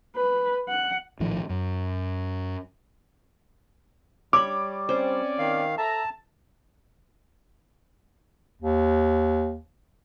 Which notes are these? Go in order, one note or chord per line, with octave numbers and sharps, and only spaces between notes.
B4
F#5
A#1 A2 D#3 F3
F#2
G3 C#5 B5 D6
C4 C#4 C5 D5
D#3 F5
A4 E5 A5 A#5
D#2